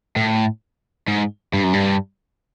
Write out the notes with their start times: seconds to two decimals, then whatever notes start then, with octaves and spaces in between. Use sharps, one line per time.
0.16 A2
1.08 G#2
1.54 G2
1.63 F#2
1.73 G2